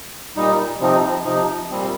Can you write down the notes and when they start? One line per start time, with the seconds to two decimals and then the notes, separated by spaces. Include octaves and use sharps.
0.36 A#2 G3 D#4
0.80 C3 F3 C4 D#4
1.25 C3 F3 D#4
1.70 A#2 G3 C4